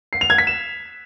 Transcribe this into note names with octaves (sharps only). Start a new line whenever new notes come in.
C7
F7
G#6
B6
E7